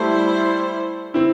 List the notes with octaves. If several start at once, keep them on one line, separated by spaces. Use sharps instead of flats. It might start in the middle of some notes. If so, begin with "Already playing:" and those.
Already playing: G3 A3 E4 C5
C4 E4